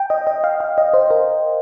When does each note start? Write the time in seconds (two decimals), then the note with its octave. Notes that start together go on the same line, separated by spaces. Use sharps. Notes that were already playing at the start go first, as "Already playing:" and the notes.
Already playing: G5
0.10 D#5
0.27 D#5
0.44 F5
0.60 F5
0.78 D#5
0.94 C5
1.11 A#4